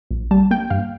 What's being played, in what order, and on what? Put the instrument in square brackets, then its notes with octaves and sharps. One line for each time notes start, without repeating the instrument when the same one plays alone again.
[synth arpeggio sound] A#1
G3 A5
A#3 G5
G2 F5